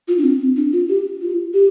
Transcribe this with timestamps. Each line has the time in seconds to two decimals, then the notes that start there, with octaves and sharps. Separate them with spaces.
0.08 F4
0.18 D4
0.24 C4
0.56 D4
0.73 F4
0.89 G4
1.22 F4
1.54 G4